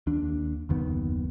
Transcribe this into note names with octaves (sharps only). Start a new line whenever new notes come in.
D#2 D4
F#1 D#2 D#3 B3